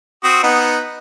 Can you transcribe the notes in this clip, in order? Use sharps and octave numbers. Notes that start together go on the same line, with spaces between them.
C4 F#4 D#6
B3 D#4 F#5